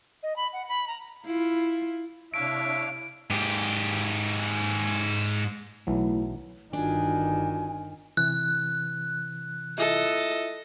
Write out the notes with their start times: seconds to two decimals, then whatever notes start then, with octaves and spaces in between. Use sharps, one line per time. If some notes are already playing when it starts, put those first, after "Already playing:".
0.23 D#5
0.36 B5
0.53 F#5
0.68 B5
0.87 A#5
1.26 E4 F4
2.34 C3 D4 E4 C#5 E5 F5 D7
3.30 G#2 G4
5.87 B1 A2 E3 F#3
6.73 G1 D#3 D4 F4 F#4 G#5
8.17 C3 E3 F#6
9.78 E4 F4 A4 D#5 E5